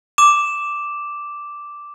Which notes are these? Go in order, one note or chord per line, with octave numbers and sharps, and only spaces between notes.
D6 E7